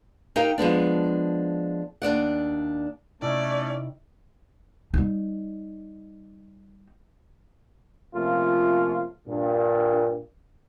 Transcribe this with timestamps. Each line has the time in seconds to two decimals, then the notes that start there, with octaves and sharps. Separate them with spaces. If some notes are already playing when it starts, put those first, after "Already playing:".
0.36 D#4 G4 A#4 F5 G5
0.58 F3 G#3 B3 D4
2.02 D#2 D4 D5 F#5
3.22 C3 A3 C#4 D#4 E4 D5
4.94 G3 D#4
8.15 C3 F3 A3 A#3 C#4 F4
9.28 G2 A#2